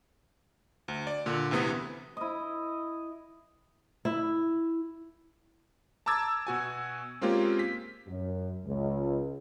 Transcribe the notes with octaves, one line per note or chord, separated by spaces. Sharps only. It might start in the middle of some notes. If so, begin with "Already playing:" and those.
D2
D5
A#2 D3
D2 C3 E3 B3 D#6
E4 D#5
E4
A5 A#5 D6 E6 G#6 A6
B2 F#4 G#5
G#3 A#3 C4 C#4 F4 G4
B6
F#2
C#2